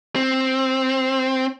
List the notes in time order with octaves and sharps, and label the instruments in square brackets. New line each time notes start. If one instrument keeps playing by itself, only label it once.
[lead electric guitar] C4